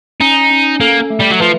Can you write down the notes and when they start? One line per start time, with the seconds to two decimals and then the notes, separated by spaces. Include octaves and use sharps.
0.21 C#4 D#4
0.51 C#4
0.80 A#3 A4
1.10 A3
1.20 G3
1.31 F#3
1.40 F3 B4